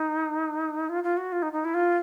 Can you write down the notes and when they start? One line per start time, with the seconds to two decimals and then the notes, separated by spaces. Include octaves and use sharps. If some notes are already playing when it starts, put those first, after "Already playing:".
Already playing: D#4
0.89 F4
1.03 F4
1.17 F#4
1.32 F4
1.42 D#4
1.53 D#4
1.64 E4
1.74 F4